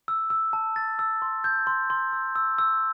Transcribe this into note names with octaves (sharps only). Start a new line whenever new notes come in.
E6
E6
A5
A6
E6
C6
G6
C6
C6
E6
E6
E6